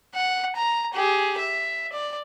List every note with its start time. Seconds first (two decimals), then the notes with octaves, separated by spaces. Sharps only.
0.15 F#5
0.56 A#5
0.93 G4 G#4
1.38 E5
1.92 D5